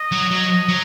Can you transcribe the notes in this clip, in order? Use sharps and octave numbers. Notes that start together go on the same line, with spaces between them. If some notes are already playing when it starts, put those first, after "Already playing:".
Already playing: D#5
F#3
F#3
F#3